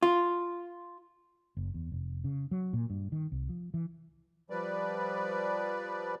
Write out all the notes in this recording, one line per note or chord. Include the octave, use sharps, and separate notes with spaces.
F4
F#1
E2
F1
C#3
F#3
A#2
G2
D#3
C2
F3
E3
F3 G3 B4 D5